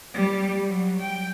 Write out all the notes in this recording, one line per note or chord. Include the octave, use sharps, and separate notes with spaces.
G3
F#3
G5